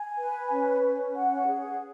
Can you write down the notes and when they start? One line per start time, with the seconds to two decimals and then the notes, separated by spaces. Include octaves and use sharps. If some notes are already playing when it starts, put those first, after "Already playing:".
Already playing: G#5
0.18 B4
0.50 C#4
0.82 C#4
1.15 F#5
1.47 G#4